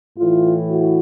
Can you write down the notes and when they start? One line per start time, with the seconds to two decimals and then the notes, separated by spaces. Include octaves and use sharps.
0.18 A2 E3 F4
0.70 F#4